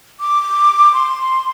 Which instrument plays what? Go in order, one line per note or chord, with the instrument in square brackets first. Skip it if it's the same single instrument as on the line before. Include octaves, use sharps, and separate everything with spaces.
[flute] D6
C6